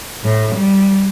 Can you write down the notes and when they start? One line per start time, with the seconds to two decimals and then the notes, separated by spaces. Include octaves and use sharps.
0.24 A2
0.55 G3